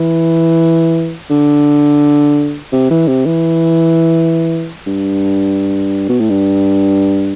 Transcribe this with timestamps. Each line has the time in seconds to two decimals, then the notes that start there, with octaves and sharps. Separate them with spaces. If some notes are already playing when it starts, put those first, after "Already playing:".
Already playing: E3
1.30 D3
2.72 C3
2.90 E3
3.08 C3
3.26 E3
4.86 G2
6.09 B2
6.20 A2
6.30 G2